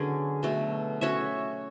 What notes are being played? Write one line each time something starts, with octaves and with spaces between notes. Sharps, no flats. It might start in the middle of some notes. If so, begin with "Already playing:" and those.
Already playing: D3 F#3 B3 C#4 G#4
B2 F#3 A3
C#4 F#4 C#5 E5